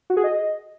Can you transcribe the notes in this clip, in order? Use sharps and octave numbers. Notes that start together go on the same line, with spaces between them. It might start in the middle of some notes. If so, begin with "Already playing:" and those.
F#4
G#4
D#5